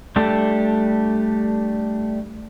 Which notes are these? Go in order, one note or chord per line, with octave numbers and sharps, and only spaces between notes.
G3 A3 D4 G4 A4